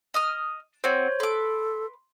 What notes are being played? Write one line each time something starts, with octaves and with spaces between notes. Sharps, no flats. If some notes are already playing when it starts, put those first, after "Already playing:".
D#5 D#6 F6
C4 F#4 C5 C#5
A4 B4 C6 D6